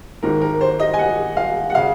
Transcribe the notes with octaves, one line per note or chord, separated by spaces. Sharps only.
G#1 G#2 D#3 A#4
A#4
C5
D#5
G#5
F#5
F5
F#5
C#3 F5